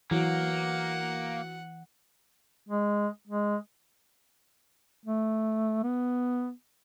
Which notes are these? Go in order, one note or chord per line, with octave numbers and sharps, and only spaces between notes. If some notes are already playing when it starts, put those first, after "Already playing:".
E3 F#3 A#3 F#5
G#3
G#3
A3
B3